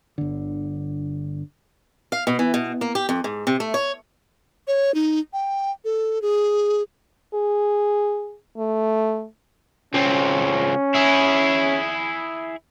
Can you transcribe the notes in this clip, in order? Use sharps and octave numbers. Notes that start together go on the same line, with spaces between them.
G1 D3
F5
B2
E3
B2
A#3
G4
F2
G#2
C3
A3
C#5
C#5
D#4
G5
A4
G#4
G#4
A3
C#2 C4 C#4
E4 G#4